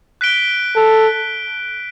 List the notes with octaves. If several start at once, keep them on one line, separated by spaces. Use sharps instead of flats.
F#6 B6 D7 G7
A4